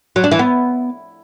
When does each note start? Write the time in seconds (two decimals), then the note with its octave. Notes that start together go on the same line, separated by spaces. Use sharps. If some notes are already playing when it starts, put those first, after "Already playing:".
0.16 F#3
0.24 D4
0.31 E3
0.39 B3